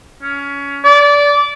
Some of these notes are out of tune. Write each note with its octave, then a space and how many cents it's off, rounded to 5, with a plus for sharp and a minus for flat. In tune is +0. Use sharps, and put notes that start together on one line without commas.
C#4 +20
D5 -20